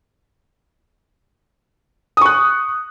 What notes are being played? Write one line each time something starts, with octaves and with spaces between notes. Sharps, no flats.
C#6 D#6 F#6